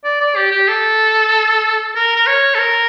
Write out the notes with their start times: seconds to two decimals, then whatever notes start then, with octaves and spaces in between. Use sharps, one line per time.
0.04 D5
0.21 D5
0.36 G4
0.52 G4
0.69 A4
1.96 A#4
2.16 A#4
2.27 C#5
2.55 A4
2.59 A#4